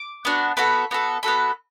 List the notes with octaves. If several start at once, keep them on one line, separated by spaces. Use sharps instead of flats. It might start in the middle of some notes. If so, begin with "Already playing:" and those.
Already playing: D6
B3 D4 F#4
B3 F#4 A4 B5
B3 F#4 A4
B3 F#4 A4 B5